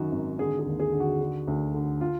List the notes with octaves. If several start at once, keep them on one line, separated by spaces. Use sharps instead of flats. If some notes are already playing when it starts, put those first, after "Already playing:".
Already playing: F#2 D#3 F#4
G#1
D3 G#4
G#4
D#2
G#4
D3
F#4
D3
D2
D3
F4